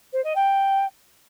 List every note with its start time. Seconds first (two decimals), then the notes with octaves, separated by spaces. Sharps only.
0.13 C5
0.24 D#5
0.36 G5